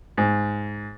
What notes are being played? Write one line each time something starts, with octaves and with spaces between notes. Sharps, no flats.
G#2